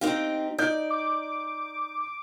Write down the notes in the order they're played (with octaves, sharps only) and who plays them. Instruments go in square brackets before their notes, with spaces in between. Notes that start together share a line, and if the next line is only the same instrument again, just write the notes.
[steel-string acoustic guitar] C4 D#4 G4 [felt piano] F5
[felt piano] D#4 G6 [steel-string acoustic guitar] D5
[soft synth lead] D6